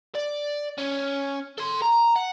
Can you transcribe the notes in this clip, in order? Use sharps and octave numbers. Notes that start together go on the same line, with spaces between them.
D5
C#4
A4 C6
A#5
F#5